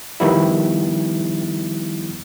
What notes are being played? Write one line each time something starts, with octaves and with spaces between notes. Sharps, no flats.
D#3 F3 G3 B3 D#4 E4